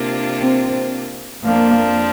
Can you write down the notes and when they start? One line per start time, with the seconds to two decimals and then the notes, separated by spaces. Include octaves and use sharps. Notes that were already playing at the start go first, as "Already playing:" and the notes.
Already playing: C3 A#3 D4 F4
0.40 C4
1.43 F2 F3 A#3 D4